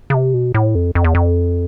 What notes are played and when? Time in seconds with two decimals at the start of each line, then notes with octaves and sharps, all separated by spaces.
0.10 C#3
0.14 C3
0.34 B2
0.54 A2
0.75 F2
0.95 F2
1.04 E2
1.15 F2